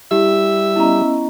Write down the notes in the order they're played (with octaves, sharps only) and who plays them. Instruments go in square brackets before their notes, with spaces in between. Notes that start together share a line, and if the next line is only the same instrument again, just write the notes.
[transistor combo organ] G3 [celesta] E4 G4 [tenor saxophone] E5
[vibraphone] B3 C#4 D#5 [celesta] E4 A#5